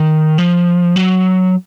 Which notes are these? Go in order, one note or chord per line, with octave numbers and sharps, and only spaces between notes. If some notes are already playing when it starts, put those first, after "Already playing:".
Already playing: D#3
F3
F#3